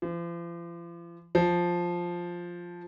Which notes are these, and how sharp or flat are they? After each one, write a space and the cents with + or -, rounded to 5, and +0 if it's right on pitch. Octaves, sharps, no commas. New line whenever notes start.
F3 -40
F3 +5